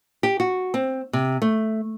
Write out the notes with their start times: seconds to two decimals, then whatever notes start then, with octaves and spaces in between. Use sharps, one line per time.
0.23 G4
0.40 F#4
0.74 C4
1.13 C3
1.42 A3